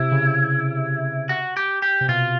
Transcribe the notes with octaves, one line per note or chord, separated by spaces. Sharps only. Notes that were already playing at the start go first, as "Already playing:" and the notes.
Already playing: C3 E4
C#3
F#4
G4
G4
C3
B2 F4